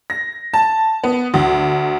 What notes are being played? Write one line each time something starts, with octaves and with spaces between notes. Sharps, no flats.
A#6
A5
B3
D2